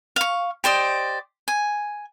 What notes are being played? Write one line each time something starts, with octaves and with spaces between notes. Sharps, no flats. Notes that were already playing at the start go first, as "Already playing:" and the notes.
F5 C#6
G4 C5 D5 D#5
G#5